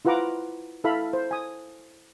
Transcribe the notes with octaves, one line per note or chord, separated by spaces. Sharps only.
E4 F4 B4 F#5 A#5 D6
E4 A4 E5 F5 B5
C5
G#5 D#6